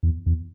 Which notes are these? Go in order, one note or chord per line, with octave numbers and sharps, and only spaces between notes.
E2
E2